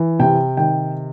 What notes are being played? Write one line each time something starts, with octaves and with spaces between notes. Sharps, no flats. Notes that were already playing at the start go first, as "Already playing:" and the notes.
Already playing: E3
C3 G5
D#3 G5